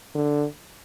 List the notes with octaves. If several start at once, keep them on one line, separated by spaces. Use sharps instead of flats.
D3